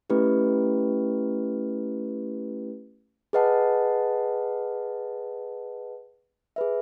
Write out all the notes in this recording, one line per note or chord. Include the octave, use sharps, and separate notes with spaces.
A3 C#4 E4 G4 B4
G#4 B4 D#5 F#5 A5
G#4 B4 E5